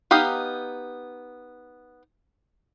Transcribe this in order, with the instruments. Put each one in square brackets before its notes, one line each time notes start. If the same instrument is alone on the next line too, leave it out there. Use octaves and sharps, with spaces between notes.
[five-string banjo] B3 D#4 G4 D#5 F5